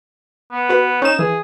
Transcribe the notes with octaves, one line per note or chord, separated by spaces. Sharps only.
B3
F#4 B4
C#4 D#4 E7
E3 G#4